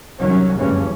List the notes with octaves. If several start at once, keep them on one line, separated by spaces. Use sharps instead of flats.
C2 D#3 F#3 C#4
F#1 D2 G2 C#3 E3 C#4